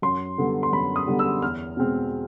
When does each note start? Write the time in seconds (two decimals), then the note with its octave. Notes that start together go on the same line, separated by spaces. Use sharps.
0.02 F#2 C6
0.38 D3 G3 B3
0.63 C6
0.73 F#2 B5
0.96 D#6
1.07 D3 G3 B3
1.19 E6
1.42 E2 F6
1.77 B2 G#3 C4